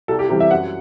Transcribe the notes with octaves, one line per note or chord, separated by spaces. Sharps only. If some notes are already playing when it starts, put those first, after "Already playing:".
C2 A4
G4
C3 E3 G3
E5
F#2 F#5